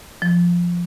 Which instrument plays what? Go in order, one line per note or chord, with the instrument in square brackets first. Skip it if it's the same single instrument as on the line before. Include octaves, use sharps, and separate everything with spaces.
[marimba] F3